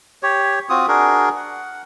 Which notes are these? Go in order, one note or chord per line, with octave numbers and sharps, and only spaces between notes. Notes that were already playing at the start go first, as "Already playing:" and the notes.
G4 C#5
C4 F4 F#4 D#6
D4 F#4 G#4 A#4
F#5